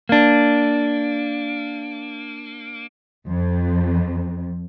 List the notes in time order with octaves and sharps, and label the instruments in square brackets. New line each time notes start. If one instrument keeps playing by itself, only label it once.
[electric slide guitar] A#3 D4
[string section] F2